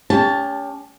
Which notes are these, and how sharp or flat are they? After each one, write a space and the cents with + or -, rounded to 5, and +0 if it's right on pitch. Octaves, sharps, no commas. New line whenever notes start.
C#4 +35 G4 +25 A5 +0